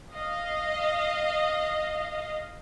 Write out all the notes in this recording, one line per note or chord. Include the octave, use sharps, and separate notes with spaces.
D#5 F5